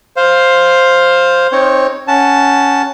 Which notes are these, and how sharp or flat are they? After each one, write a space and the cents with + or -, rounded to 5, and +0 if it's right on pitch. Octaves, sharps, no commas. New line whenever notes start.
C5 +5 F5 +5
C4 +20 D#4 +0 C#5 +0
C#4 +5 F#5 +0 A5 +0